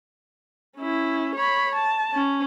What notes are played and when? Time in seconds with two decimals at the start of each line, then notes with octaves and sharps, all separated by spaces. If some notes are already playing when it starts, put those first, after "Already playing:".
0.77 C#4 E4
1.35 C#5 B5
1.75 A5
2.14 C#4